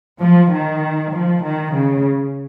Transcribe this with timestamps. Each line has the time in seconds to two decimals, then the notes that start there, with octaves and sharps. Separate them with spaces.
0.20 F3
0.52 D#3
1.13 F3
1.43 D#3
1.74 C#3